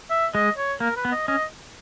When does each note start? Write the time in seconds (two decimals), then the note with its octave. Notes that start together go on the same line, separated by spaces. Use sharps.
0.10 E5
0.34 G#3 D#5
0.58 C#5
0.80 A#3 A#4
0.96 B4
1.05 B3
1.12 D#5
1.28 C#4 D#5